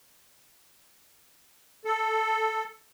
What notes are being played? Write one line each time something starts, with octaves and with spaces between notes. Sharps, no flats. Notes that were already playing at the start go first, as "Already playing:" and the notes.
A4